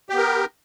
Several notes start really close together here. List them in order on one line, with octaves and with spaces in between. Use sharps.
G4 B3 A#4